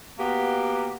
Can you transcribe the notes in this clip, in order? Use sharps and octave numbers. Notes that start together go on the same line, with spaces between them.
A#3 B3 F#4 G4